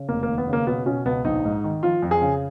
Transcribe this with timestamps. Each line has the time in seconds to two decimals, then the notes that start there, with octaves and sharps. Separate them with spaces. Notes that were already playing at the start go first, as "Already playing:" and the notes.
Already playing: C#3
0.09 F1 A#3
0.23 A#3
0.28 D#2
0.38 B3
0.47 C#3
0.53 A#3
0.67 B2 B3
0.86 B2 C#4
1.05 C#2 B3
1.25 A#1 D#4
1.45 G#2
1.64 D#3
1.83 F3 F4
2.03 F2
2.11 G#4
2.22 C#3